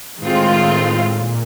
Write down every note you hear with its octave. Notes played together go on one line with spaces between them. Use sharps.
A2 D#3 G#3 C4 F4
A#2